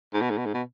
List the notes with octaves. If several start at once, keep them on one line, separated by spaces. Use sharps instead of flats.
G#2
B2
G#2
B2
G#2
B2